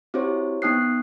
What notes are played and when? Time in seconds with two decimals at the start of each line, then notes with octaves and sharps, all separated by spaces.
0.14 C4 E4 F#4 G4 C5 C#5
0.62 B3 D#4 G5 D#6 F#6 C7